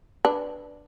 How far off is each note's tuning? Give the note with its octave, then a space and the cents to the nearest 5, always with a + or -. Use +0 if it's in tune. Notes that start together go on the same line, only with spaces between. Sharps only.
D4 +0 B4 -5